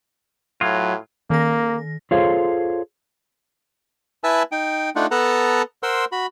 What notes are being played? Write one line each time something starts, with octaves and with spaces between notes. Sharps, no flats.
A2 F#3 F4
D#3 A#3 A#6
F4 G#4 A4 C5 C#5 F5
E4 B4 E5 G#5 A5 E6
D#4 G5
A3 D4 D#4 F4 F#5
B3 A4 B4 F#5 A5 A#5
A#4 C5 F#5 C6 E6
F#4 B5